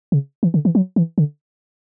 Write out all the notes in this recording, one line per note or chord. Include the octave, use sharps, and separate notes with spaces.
C#3
E3
D3
E3
F#3
E3
D3